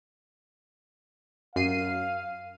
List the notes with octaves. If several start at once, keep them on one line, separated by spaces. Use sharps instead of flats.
F#2 F5 C7 D#7